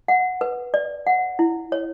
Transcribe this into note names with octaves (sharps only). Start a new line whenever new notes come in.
F#5
B4
D5
F#5
E4
C#5